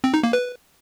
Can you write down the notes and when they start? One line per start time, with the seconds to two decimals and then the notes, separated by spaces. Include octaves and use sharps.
0.04 C4
0.14 D#4
0.23 A#3
0.33 B4